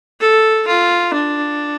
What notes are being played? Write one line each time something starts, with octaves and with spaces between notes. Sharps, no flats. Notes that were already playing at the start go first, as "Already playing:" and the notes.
A4
F4
D4